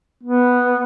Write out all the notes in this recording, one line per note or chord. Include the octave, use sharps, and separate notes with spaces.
B3